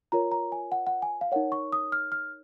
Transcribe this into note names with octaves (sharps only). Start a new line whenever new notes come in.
F4 A#4 C#5 A#5
A#5
G#5
F#5
F#5
G#5
F5
D#4 A#4 C#5 F#5
C#6
D#6
F6
F6